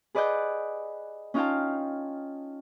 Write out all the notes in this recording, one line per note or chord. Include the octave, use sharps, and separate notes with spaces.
G#4 B4 D5 D#5 F#5 G6
C#4 D#4 F4 F5 G5 A5